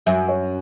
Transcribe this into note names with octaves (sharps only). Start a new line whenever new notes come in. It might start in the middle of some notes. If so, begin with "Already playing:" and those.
F#2 E5
C#5